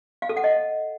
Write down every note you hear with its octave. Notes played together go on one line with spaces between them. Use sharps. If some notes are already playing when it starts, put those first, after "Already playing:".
F5
A4
F#5
D#5